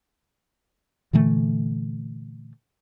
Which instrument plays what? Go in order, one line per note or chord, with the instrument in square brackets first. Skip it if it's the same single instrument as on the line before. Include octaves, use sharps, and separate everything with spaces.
[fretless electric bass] A#2 D3 E3 A3